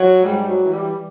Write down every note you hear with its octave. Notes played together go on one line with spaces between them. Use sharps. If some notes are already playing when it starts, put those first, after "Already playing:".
Already playing: F#3
G#2 G3
F#3
E3
G3